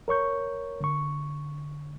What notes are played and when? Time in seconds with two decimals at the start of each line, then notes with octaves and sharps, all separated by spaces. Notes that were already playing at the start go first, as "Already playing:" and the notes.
0.08 A#4 C#5 C#6 G6
0.81 D3 C#6